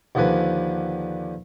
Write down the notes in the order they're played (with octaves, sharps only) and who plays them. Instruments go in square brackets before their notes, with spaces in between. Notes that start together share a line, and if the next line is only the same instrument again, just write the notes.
[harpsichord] D#2 D3 F3 D4 B4 G#5